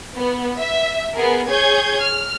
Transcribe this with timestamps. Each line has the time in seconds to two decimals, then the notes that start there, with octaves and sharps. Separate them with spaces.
0.16 B3
0.59 E5
1.13 B3 G#4 A#4
1.47 G#4 C#5 G6 G#6
2.00 F6